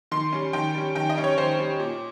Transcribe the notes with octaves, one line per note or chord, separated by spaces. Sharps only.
D#3 C6
G3 C#4
D#3 G5
G3 C#4
D#3 G5
D#5
G3 C#4
C#5
D#3 C5
G3 C#4
A#2